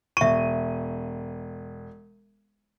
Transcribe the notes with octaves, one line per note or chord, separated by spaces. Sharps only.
E1 E5 C#6 D#7